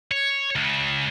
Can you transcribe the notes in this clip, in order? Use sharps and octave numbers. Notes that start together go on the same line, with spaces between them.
C#5
C#2 C#3